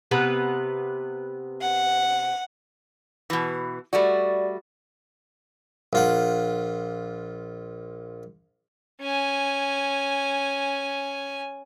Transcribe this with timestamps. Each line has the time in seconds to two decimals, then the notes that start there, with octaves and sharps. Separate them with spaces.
0.11 C3 B3 B4
1.62 F#5
3.30 B2 E3
3.93 G3 A3 F#4 D5
5.93 A#1 F4 F#5
9.01 C#4 G#5